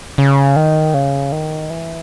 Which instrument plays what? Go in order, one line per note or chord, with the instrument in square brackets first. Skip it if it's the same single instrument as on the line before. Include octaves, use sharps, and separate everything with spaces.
[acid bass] C#3
D#3
C#3
D#3
E3